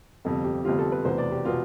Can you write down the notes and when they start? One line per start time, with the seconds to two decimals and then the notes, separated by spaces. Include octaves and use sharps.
0.25 G1 F2 C3 G3 A4
0.45 G4
0.64 G1 F2 C3 G3 F4
0.79 A4
0.92 B4
1.05 F1 E2 B2 B3 C5
1.18 D5
1.32 G4
1.45 B2 B3 F4